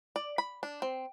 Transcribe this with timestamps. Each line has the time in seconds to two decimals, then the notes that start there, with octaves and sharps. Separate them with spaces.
0.16 D5
0.38 B5
0.63 D4
0.82 C4